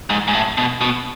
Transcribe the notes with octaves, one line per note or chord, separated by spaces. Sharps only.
G#2
G#2
A2
B2
B2